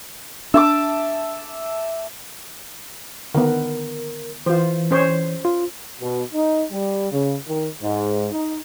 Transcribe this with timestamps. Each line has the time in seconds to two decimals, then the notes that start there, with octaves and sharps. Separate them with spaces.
0.54 D4 E5 A5 D6
3.34 D3 D#3 B3 A#4
4.46 E3 F4 C5
4.91 C#4 C5 C#5
5.45 F4
6.00 B2
6.33 D#4
6.72 G3
7.12 C#3
7.46 D#3
7.80 G#2
8.32 D#4